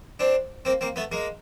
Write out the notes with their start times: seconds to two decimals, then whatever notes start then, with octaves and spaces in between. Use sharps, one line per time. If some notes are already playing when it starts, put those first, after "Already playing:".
0.19 C4 D4
0.65 A#3 C4
0.81 A#3 C4
0.96 A3 B3
1.12 G#3 A#3